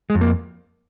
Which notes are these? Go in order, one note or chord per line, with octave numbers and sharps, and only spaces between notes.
G#3
F2
A#3